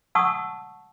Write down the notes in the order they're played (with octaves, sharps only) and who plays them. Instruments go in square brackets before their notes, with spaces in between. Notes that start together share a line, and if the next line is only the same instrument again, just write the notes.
[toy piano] F#5 A5 C#6 D#6 E6